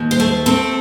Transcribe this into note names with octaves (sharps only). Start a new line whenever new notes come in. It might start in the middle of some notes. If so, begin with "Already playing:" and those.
Already playing: D#2
C5
A3
C4 A4